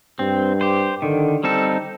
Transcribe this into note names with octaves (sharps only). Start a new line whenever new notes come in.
G2 C4
G4 C5
D3 D#3
G3 C4 D#4 A4